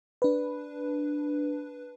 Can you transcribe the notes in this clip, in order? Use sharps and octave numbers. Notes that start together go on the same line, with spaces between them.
D4 B4